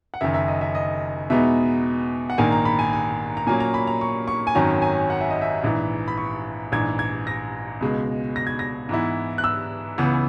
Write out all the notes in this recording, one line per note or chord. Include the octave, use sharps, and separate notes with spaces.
F#5
F#1 F#2 D#3 E5
E5
D#5
E5
D#5
E2 B2 G#3 B3 D#4 E5
F#5
A#1 G#2 D#3 A#3 G#5
A#5
B5
G#5
G#5
A#5
A#2 F#3 A#3 C#4 G#5
A#5
B5
A#5
C#6
C#6
G#5
G#1 F#2 D#3 F#3 C#4 A#5
G#5
F#5
E5
D#5
E5
A#1 G#2 E3
B5
C#6
A#1 G#2 E3 G#6
G#6
A#6
C#2 B2 G#3
A#6
G#6
A#6
G#2 E3 B3 E4
F#6
E6
C#2 C#3 E3 B3